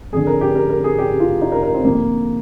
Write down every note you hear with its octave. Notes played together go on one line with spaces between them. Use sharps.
F2 D3 G#4
A#4
G4
A#4
A#4
G#4
G4
F4
D#4
A#4
A#4
C4
F2 D3 A#3